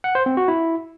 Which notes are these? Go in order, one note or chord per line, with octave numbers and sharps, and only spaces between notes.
F#5
C5
C4
F#4
E4